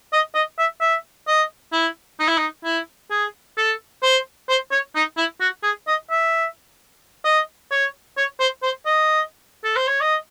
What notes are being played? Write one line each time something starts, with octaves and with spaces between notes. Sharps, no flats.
D#5
D#5
E5
E5
D#5
E4
D#4
E4
D#4
E4
G#4
A4
C5
C5
C#5
D#4
E4
F#4
G#4
D#5
E5
D#5
C#5
C#5
C5
C5
D#5
A4
C5
C#5
D#5